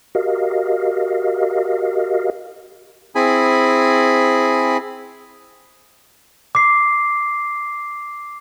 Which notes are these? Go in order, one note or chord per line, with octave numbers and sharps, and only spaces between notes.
F#4 G4 A#4 D#5 F5
C4 E4 G#4 G#5 B5
D6 C7